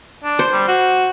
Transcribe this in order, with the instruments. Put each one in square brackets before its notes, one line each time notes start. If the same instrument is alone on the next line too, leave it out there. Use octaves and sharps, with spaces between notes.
[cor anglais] D4
[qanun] C5
[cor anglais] G3
F#4